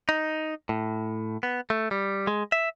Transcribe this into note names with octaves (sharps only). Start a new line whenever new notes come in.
D#4
A2
B3
A3
G3
G#3
E5